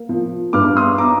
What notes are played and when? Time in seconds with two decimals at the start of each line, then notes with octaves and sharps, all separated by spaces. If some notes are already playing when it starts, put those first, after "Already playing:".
Already playing: A#3
0.09 F3
0.53 G2 D6 F6
0.76 C6 D#6
0.98 A#5 D6